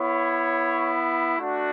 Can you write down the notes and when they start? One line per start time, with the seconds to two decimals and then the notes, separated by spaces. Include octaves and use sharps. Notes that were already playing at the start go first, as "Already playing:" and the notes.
Already playing: B3 E4 C#5
1.38 A3 D4 F#4